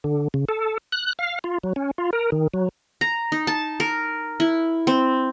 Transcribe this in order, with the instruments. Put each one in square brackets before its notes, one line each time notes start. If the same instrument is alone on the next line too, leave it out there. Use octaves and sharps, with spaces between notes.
[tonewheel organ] D3
C#3
A4
F#6
F5
F4
F#3
C#4
F4
A#4
D#3
F#3
[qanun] A#5
D#4
A5
A#4
E4
C4